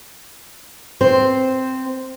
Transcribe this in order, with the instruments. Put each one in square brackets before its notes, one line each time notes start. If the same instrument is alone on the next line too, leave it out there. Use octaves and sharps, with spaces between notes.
[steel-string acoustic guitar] C4 C5